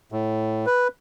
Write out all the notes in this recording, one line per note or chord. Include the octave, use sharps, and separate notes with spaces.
A2
B4